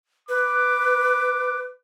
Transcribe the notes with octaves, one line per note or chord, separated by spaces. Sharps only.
B4 D6